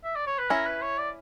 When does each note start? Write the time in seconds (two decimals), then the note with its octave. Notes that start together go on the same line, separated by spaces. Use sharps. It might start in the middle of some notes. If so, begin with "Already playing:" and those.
0.04 E5
0.16 D5
0.26 C#5
0.38 B4
0.50 C#4 E4 A#4
0.66 B4
0.82 C#5
0.98 D5